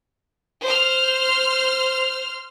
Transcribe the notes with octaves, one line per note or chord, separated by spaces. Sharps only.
C5 F6